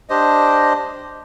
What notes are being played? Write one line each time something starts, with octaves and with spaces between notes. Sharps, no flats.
D4 G4 C5 D#5